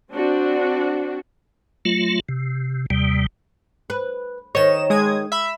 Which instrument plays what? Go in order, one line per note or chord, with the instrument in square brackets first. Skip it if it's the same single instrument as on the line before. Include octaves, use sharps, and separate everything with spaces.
[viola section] C4 D4 F#4
[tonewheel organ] F#3 A3 F4
C3
D#2 C3 G3
[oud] B4
[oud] D#3 C#5 [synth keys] D#5 E7
[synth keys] G#3 D#6 G#6
E5 B5